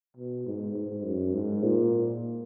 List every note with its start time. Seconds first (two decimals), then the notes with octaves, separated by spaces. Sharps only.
0.17 B2
0.46 G#2
0.76 G#2
1.04 F#2
1.34 G#2
1.63 A#2